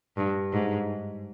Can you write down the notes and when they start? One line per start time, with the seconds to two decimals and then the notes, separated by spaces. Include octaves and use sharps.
0.17 G2
0.53 G#2